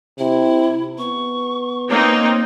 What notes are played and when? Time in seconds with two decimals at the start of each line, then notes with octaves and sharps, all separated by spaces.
0.19 C3 E4
0.98 B3 C#6
1.89 A#3 C4 D#4 C#5